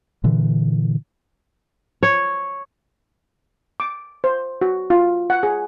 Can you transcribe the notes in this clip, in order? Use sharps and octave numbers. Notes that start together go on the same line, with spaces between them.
A#2 D3 E3
C#5
D6
C5
F#4
F4
F#5
G#4